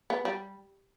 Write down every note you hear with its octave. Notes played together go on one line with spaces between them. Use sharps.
B3
G3